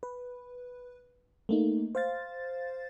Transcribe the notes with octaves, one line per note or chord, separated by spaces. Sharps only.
B4
A3 A#3 D#4
C5 F5 A6